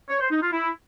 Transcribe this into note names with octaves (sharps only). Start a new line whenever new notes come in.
C#5
C5
D#4
F4
E4